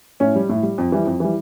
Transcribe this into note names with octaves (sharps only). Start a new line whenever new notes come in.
A2 C#4
G3
A2
G3
F2
E3 G3
F2
E3 G3